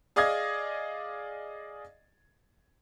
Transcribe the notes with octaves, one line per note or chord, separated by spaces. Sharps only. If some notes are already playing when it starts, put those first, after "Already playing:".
G#4 D5 D#5 F5 D#6 G#6